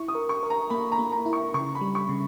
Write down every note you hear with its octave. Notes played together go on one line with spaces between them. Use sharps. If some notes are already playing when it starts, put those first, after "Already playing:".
Already playing: E4 C#6
D#6
A#4
C#6
A#4
A#5
A#3 B5
A#5
A#3
A#5
E4
C#6
C#3 C#6
B5
G3
C#6
C#3